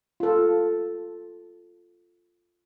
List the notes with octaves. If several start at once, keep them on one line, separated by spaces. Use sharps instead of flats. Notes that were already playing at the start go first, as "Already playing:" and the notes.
F4 A4